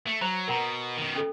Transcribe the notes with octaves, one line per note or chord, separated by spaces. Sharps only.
A3
F#3 C5 A#5
B2 A#4 F#5 A#5
B2 D#3
C#4 A4